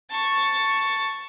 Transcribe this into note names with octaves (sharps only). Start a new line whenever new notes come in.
A5 C#6